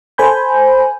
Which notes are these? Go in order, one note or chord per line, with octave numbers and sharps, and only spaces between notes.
A4 C5 G#5 B5 G6